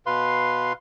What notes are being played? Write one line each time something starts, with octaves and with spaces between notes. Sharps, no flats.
B2 B4 F5 C6